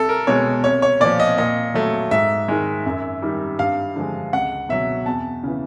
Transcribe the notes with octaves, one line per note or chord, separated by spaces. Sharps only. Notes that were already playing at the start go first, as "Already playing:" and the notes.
Already playing: C2 A4
A#4
B2 G#3 C#5
C2 C#5
C#5
A#2 F3 D5
D#5
A#2 D#5
F#3 A3
G#2 E5
D#3 G#3
F#2
D#3 G3
G2 F5
D3 F3 G#3
C#2 F#5
B2 F#3 E5
E2 A5
C#3 E3